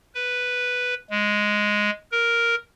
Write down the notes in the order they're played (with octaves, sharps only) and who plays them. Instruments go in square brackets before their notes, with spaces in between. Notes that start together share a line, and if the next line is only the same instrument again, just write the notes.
[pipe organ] B4
G#3
A#4